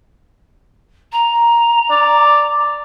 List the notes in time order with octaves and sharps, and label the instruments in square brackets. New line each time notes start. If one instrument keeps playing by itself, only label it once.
[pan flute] A#5
[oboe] D5